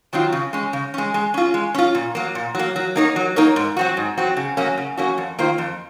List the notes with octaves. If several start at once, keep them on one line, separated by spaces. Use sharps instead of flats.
D#3 F#3 C4 F4
C#3
G#3 C#4
C#3
G#3 C#4
G#3
C#4 F4
G#3
C#4 F4
A#2
F#3 A#3
A#2
F#3 A#3
F#3
A#3 D#4 A#4 C#5
F#3
A#3 D#4 A#4 C#5
G#2
F#3 C4 F#4
G#2
F#3 C4 F#4
C#3
F#3 A#3 C#4 F#4
C#3
F#3 A#3 C#4 F#4
F2
D#3 A#3 F4 C5
F2